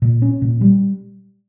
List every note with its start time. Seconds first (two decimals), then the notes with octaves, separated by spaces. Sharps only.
0.02 A#2
0.22 C#4
0.42 A#2
0.61 G3